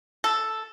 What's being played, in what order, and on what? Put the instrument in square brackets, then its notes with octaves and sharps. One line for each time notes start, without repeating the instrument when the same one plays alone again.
[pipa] A4